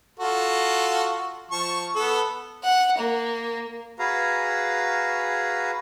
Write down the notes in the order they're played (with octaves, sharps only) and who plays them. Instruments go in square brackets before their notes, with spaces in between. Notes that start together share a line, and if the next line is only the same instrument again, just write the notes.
[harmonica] F4 F#4 A4
F3 A5 C#6
B3 A4
[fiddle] F#5
A#3
[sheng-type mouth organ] F#4 G#4 B4 F5 A#5